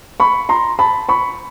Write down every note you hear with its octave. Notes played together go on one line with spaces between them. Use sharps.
B5 C#6
A#5 C6
A5 B5
B5 C#6